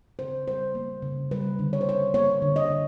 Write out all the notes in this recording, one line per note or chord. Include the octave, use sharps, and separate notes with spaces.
C#3 C5
G3 C5
A#3
C#3
G3 B4
D3
C#5
C5
A#3 C#5
A#3 C#5
D3
D#5
D3